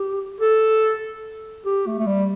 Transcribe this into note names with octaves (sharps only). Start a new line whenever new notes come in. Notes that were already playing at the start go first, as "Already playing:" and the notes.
Already playing: G4
A4
G4
A3
A3
G3